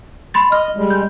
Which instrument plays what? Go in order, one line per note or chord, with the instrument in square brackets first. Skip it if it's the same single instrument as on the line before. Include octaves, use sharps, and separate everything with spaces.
[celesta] B5 C6 A6
[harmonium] D#5 [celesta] F6
[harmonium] G3 G#3
[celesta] G6